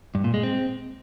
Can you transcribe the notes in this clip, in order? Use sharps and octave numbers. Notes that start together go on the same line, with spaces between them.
G2
A#2
G#3
C4